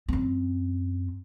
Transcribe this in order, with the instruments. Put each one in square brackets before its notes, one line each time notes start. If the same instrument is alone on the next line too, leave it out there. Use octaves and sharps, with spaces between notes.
[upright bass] F#2 C4